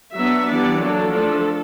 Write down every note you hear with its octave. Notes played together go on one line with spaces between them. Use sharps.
F#3 B3 D4 E5
E3 G3 B3 D4 D5
F#3 A#3 D4 A4
F3 A3 D4